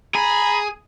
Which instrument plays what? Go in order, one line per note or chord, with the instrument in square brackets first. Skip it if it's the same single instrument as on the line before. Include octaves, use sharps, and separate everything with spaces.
[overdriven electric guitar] G#4 [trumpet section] A#5 B5